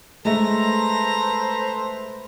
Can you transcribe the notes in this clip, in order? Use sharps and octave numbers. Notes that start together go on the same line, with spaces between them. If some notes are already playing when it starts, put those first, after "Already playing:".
G#3 A3 A4 B4 C5 A#5